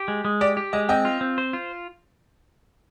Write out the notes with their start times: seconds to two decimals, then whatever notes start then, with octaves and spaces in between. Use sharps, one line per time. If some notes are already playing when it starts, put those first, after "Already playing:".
Already playing: G4
0.08 G#3
0.25 G#3
0.41 G4 D5
0.57 G4
0.73 G#3 D#5
0.89 C4 D#5 G5
1.05 F4
1.21 C4
1.38 C5
1.53 F4